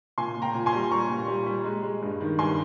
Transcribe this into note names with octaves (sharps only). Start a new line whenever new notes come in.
A#2 G#5 C6
A#2
G5 A#5
A#2
G#5 C6
G3
G3 A#5 C#6
A#2
G3
G3
G#3
G#3
G2
D#3
G2 G#5 C6